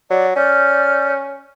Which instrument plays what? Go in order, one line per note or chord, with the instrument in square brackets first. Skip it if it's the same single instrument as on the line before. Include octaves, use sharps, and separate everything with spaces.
[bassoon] F#3 [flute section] D5
[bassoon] C#4 [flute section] D5 F6 G6